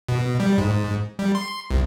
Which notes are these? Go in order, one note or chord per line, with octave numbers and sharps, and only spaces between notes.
B2
G3
G#2
G3
C6
C2